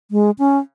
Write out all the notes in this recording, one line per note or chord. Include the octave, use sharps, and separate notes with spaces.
G#3
C#4